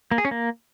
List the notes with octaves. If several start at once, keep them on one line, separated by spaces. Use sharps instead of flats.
A#3
G#4
C#4
A#3